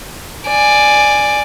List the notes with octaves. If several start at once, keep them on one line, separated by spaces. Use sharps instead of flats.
D5 G#5